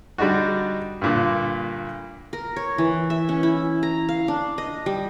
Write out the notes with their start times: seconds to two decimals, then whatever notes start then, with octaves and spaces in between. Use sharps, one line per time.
0.18 D3 G3 D4 D#4 F#4
1.02 G2 A#2 D3
2.33 A#4
2.56 C#5
2.78 E3
3.10 E5
3.29 C#4
3.43 E4
3.83 A#5
4.09 F5
4.28 D4
4.58 D#5
4.86 G3